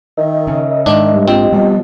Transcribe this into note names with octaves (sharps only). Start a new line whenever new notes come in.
D#3 A#4 D#5 E5
C#3
G#2 D#3 D4
G2
A#1 C4 F4 G4 D#5
B2 F3 G3